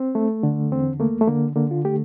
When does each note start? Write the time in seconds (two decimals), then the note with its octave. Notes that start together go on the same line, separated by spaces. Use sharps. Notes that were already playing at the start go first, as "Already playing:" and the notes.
Already playing: C4
0.15 A3
0.43 D3
0.71 E2 C4
1.00 A3 A#3
1.21 A3
1.27 D3 A#3
1.56 D3 A#3
1.71 F4
1.84 A3 G4